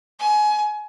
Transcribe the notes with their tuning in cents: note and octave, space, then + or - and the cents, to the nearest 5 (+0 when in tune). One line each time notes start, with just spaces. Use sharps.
G#5 +25